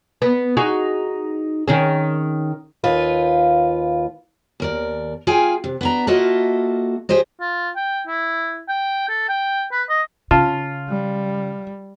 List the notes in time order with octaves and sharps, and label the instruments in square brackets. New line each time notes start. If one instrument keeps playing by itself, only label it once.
[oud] B3
D#4 F#4 G#4
D#3 C#4 G#4
[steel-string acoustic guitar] D#2 F4 B4
D#2 A#4 D5
F4 G#4 F5 G5 G#5
C3
B3 D4 A#5
A#3 F4 F#4 A4 D#5 E5
G4 G#4 C5 D#5
[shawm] F4
G5
E4
G5
A4
G5
B4
D#5
[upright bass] C#3 [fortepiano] F4 [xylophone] A5
[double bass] G3